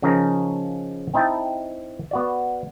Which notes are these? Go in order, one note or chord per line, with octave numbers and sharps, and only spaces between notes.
C#3 F3 C#4 D#4 A#4
C4 D#4 E4 G5 A5
B3 F#4 D5